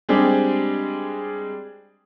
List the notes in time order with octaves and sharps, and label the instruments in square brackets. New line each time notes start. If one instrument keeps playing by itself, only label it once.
[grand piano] G3 G#3 C4 D4 G4 G#4